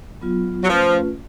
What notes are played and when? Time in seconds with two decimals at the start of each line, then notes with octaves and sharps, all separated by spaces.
0.22 F#3 B3 F4
0.64 F#3
0.68 F3 A3 C#4 F4 B4